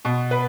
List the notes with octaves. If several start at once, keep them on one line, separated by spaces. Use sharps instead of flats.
B2
B4